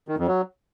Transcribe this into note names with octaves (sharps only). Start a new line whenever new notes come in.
D#3
F2
F#3